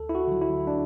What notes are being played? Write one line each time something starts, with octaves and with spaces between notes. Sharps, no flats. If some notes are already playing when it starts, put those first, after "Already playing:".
Already playing: D2 A4
E4
F#4
D3 F#3
E4
D4